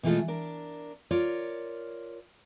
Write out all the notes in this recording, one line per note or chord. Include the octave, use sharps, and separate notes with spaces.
B2 E3 G#3 A3 F4 A4
D4 A#4
F4 A#4 C#5 D5